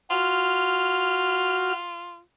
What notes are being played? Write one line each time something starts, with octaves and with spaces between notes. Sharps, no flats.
F4 F#4 F6